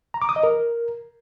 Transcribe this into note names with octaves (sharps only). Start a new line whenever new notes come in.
A#5
D6
D#6
D#5
A#4